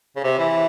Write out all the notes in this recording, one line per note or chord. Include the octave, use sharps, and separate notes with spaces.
C#3
C3
E3